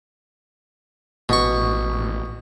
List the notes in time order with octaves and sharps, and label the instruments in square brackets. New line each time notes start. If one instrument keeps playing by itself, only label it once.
[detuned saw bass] A1 [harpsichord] B2 C#6